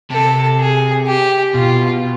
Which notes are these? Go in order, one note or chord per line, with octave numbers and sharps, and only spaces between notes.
C3 A4
G#4
G4
B2 F4